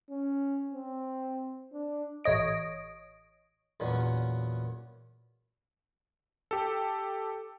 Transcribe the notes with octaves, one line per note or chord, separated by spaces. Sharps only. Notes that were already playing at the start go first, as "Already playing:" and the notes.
C#4
C4
D4
A1 C#5 D#5 D7
E2 A#2 F#3 C#4
G4 A4